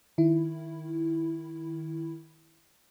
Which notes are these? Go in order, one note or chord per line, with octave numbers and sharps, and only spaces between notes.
D#3 E4